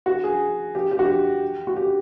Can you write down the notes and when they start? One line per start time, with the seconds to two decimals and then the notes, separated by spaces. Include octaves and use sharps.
0.06 F#4
0.24 G#4
0.75 G4
0.91 G4
0.99 F#4
1.06 G4
1.67 F#4
1.77 G4